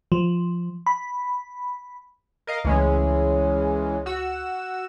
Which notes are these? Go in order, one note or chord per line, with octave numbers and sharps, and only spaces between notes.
F3
B5
A#4 D#5 F5
C#2 E3 G#3 A3 C#4
F#4 E6